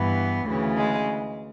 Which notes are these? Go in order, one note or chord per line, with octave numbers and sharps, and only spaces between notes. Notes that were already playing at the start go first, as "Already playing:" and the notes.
Already playing: G2 E3 B3
D2 C#3 E3
G#3